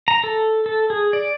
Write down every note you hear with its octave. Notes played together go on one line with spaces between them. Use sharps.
A#5
A4
A4
G#4
D5